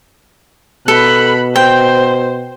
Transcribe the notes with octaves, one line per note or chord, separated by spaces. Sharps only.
B2 A4 B5 F#6
C5 G5